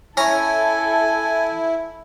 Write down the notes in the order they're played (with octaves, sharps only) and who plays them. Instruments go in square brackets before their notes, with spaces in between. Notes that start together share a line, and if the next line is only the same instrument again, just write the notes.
[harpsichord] C#4 A#5 [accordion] E4 [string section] A4 [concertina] G#5